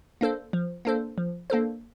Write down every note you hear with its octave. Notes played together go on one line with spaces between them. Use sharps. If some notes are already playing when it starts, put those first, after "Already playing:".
A#3 D4 A4 C5
F3
A#3 D4 A4 C5
F3
A#3 D4 A4 C5